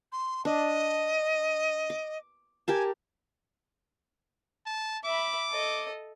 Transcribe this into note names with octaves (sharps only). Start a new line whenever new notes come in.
C6
D4 D#5
D6
G4 A#4 G#5 A5
A5
E5 B5 D6
A4 D#5